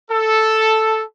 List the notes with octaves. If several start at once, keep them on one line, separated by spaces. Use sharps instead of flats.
A4